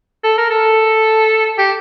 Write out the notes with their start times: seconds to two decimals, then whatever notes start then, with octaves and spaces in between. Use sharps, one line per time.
0.24 A4
0.38 A#4
0.51 A4
1.58 G4